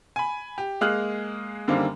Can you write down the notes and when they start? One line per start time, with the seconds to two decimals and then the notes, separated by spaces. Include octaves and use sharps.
0.16 G#5 B5
0.58 G4
0.81 G#3 A#3 G#4 F6 F#6
1.68 F#2 D3 D#3 G3 A#3 C4